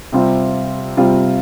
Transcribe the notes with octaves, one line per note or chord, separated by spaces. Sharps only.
C3 G3 C4 F4
C3 G3 C4 F4